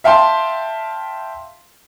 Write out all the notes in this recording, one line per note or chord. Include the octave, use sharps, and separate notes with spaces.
E5 F5 G5 A5 C6